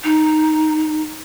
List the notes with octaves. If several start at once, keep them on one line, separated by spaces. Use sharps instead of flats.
D#4